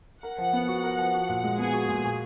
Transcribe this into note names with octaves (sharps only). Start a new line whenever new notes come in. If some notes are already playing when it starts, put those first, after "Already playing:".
A#4 F#5
F3
B3
F#4
A#4
F3
F#4
A#2
G#3
B3 G#4
F#4
A#2
F#4